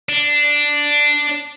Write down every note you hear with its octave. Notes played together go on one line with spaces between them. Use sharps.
D4